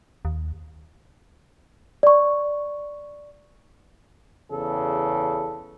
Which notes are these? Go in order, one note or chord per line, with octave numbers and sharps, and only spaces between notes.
D#2
D5 C#6
E2 C#3 A4